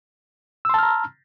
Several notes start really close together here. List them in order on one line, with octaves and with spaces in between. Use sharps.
E6 C6 A5 F6 A#5